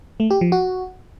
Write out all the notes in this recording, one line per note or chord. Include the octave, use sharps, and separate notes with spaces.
A3
G4
F3
F#4